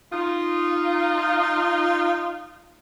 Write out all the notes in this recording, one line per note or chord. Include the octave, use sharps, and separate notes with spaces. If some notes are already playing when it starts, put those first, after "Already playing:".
D#4 F4